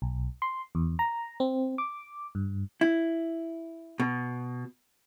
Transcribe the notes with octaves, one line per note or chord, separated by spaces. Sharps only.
B1
C6
E2
A#5
C4
D6
G2
E4
B2